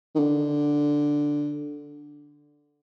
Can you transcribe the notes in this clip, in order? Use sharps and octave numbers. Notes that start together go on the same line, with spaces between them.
D#3
D3